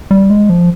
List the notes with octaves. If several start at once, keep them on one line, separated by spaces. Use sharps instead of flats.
G3
G#3
F3